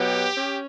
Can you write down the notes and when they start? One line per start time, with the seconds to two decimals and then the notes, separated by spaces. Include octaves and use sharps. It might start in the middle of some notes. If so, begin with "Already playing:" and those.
Already playing: B2 F#3 B3 G4
0.36 C#4